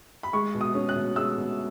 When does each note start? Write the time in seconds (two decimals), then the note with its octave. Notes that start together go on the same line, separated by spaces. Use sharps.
0.23 B5
0.33 G#3 C#6
0.54 B2
0.61 D#6
0.74 C#4
0.89 F#6
0.95 B2
1.16 G#3 E6
1.37 B2